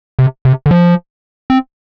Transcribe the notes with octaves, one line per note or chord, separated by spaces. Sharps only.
C3
C3
D3
F3
C4